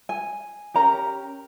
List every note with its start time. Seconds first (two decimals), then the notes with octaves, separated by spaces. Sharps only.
0.09 G#5
0.74 C#4 G4 A#4 A#5